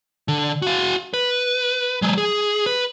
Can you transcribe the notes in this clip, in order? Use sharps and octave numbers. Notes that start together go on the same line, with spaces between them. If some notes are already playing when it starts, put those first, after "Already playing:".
D3
F#4 F5
B4
F#3 G#3
G#4
B4